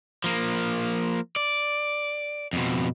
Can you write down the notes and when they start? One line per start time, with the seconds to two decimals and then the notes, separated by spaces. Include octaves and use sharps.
0.24 F3 A#3
1.36 D5
2.53 F2 B2